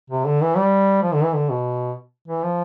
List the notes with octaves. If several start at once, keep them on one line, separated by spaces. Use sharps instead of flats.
C3
D3
E3
G3
F3
D3
E3
D3
B2
E3
F3